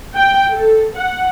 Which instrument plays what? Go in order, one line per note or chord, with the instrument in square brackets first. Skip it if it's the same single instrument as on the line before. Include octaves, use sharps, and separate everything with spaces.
[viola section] G5
A4
F#5